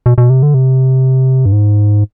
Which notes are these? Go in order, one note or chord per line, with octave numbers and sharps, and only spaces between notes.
B2
B2
C3
D3
C3
G2
G#2